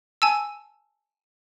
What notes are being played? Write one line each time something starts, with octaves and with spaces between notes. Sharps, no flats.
G#5 A5 E6